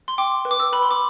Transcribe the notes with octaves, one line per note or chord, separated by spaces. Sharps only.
C6
G5 D6
B4
D6
E6
B4 B5
C6
D6